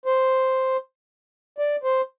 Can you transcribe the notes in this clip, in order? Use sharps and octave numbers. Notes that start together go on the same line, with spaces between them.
C5
D5
C5